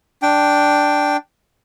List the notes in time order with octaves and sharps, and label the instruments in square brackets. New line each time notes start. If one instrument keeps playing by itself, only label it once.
[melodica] D4 G5